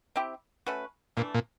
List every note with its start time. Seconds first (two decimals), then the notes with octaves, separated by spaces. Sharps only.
0.16 C4 E4 G4
0.66 A3 C#4 F#4 B4
1.17 A#2 E3 A3 D4
1.34 A#2